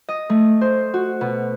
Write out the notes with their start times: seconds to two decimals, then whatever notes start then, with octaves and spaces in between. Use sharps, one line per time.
0.08 D#5
0.30 A3
0.61 C5
0.94 F#4
1.21 B2